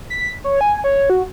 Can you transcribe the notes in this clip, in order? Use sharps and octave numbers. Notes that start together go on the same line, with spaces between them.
B6
C#5
G#5
C#5
F#4